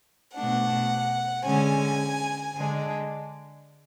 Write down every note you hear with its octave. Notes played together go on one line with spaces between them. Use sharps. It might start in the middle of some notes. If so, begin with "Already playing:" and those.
B2 A3 D4 F#5
D3 G#3 C#4 G#5
D3 G#3 D4